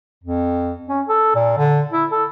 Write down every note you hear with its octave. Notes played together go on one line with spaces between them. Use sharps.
F2
C#4
A4
A#2
D3
E4
A4